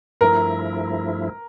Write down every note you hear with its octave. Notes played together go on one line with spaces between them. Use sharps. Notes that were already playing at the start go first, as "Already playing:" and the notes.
G2 F3 A3 E4 A#4